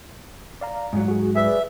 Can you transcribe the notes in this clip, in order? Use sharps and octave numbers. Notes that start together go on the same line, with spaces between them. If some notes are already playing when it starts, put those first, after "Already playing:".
D5 F5 A#5
G#2 F#3
F#4 G#4
G#4 B4 D5 E5